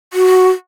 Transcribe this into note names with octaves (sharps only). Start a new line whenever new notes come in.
F#4